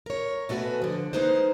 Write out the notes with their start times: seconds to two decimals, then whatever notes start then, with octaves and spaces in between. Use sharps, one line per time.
0.06 A#4 C#5
0.49 B2 A3 D#4 F#4 B4 G#5
0.82 D3 F3
1.13 G#3 A#3 D#4 B4 C5